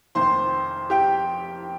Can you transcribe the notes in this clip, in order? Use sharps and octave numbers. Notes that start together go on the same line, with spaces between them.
F1 F2 D#3 C5 C6
G4 G5